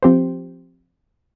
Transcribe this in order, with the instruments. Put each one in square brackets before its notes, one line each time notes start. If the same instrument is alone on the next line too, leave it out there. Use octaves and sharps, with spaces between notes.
[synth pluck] F3 C4 G4 C5